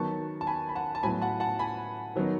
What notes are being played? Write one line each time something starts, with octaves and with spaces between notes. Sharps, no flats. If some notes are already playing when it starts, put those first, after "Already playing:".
Already playing: D#3 F#3 B3 D#4 A5 C#6
A5
G#5 B5
B5
F#5 A5
A5
A2 F#3 B3 G#5 B5
F#5 A5
F#5 A5
G#5 B5
D#3 F#3 B3 D#4